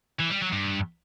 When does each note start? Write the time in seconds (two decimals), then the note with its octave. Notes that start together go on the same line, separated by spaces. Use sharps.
0.19 E3
0.30 G3
0.41 F#3
0.53 G2